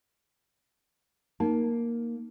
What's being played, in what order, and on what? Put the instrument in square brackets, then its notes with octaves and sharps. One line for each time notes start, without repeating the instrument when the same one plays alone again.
[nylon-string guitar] A#3 [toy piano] D#4